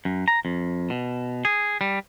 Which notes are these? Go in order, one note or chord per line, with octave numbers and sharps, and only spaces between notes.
F#2
A#5
F2
B2
G#4
G3